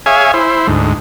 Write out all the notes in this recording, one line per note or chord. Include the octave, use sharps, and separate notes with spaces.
G#4 C#5 E5 F5 G#5
E4 C5
D2 G#2